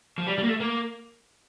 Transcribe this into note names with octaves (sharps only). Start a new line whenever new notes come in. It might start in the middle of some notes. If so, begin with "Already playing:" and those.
F3
G3
G3
A#3
A3
A#3